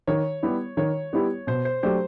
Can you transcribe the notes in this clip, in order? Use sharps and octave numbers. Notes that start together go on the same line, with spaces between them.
D#3 C#5
G3 B3 E4 G4
D#3 C#5
G3 B3 E4 G4
B2 C5
C5
F#3 A3 D4 G4 C5